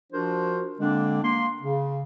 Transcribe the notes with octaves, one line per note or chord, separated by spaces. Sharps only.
F3 D4 F4 F#4 A#4 C5
D3 G#3 A#3 C4 D4
A#3 C6
C#3